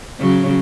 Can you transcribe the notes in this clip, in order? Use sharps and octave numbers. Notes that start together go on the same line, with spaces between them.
C#3 F#3